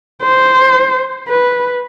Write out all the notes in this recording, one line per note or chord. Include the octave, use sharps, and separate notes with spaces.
C5
B4